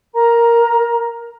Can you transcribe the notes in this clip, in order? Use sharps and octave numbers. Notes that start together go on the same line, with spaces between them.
A#4 A#5